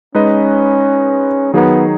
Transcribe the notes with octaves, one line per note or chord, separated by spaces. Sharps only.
G#3 C#4 D#4 B4 D#5
D#3 F#3 B3 D#4 G#4